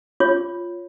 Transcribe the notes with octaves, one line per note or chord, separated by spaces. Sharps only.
F4 C#5